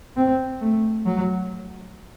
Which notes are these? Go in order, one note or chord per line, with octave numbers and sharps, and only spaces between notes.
C4
A3
F#3